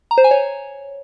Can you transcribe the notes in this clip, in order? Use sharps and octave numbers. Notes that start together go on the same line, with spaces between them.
A#5
C5
G#5
C#5